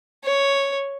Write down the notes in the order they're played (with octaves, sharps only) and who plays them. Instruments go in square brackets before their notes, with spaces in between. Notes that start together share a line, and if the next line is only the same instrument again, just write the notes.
[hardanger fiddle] C#5